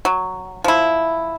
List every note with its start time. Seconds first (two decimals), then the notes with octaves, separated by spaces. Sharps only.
0.05 F#3
0.64 F3 E4